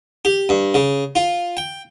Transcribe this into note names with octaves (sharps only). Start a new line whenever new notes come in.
G4
G2
C#3
F4
G5